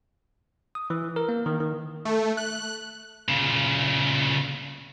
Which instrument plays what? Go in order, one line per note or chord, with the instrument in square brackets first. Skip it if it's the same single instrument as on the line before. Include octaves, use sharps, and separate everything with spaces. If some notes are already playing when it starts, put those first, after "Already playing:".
[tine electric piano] D#6
E3
A#4
A#3
D#3
D#3
[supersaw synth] A3
F#6
[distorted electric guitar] A#2 C#3